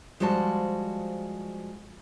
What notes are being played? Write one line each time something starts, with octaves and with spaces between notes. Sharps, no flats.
F3 G3 G#3 F#4 C5 A5